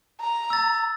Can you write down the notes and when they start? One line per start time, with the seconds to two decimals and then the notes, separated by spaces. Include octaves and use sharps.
0.21 A#5
0.50 E6 A6